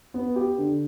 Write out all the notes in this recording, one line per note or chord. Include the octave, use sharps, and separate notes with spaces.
B3
G4
D3